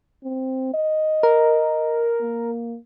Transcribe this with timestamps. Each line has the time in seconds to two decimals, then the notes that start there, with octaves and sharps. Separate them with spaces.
0.24 C4
0.74 D#5
1.23 A#4
2.21 A#3